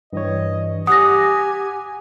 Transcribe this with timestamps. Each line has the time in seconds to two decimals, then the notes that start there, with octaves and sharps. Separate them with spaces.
0.13 G2 E3 C#5 D#5
0.87 G4 F#5 G#5 D#6 F#6 A#6